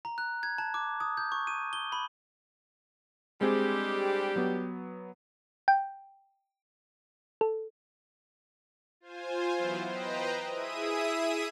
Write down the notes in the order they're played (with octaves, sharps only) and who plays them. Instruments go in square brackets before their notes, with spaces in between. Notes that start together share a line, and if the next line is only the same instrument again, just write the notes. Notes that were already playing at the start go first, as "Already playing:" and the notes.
[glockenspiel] A#5
F#6
G#6
A5
D6
D#6
G6
C#6
D#7
G7
B5
[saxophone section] G3 D4 G4 [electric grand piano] G#3 C4 G#4
[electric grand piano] F#3 B3
[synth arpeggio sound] G5
A4
[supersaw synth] F4 C5 G#5
E3 F#3 B3 E4 F4 C5
B4 C5 D#5 G5 A#5
E4 G#4 E5 D#6 D#7